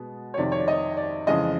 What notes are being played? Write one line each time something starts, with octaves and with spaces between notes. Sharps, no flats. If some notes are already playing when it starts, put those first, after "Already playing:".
Already playing: B2 G#3 B3
C#5
F2 C3 D#3 D5
C#5
D5
D#5
D5
F2 C#3 E3 G#3 D#5